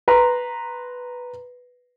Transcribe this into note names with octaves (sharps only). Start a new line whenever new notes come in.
B4 A#5 C6